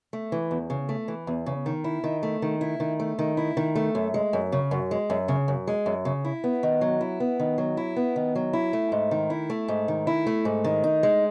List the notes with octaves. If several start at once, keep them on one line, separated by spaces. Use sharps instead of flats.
A3
E3
E2
C#3
A3
E3
E2
C#3
D#3
E4
D#3
A3
D#3
E4
D#3
A3
D#3
E4
D#3
A3
F#2
G#3
F#2
C#3
F#2
G#3
F#2
C#3
F#2
G#3
F#2
C#3
E4
B3
D#3
F#3
E4
B3
D#3
F#3
E4
B3
D#3
F#3
E4
A3
G#2
D#3
E4
A3
G#2
D#3
E4
A3
G#2
D#3
D#4
G#3